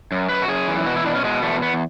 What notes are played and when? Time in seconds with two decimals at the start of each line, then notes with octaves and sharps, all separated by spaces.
0.12 F#2
0.29 F#2 B4
0.42 F#4
0.48 F#2 G#4
0.68 E3
0.86 B2 F#4
0.96 E4
1.05 B2 D4
1.15 C#4
1.24 B2 G#3
1.42 E2 A3
1.62 E2 B3